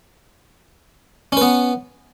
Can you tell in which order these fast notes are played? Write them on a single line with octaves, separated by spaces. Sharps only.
C#4 B4 B3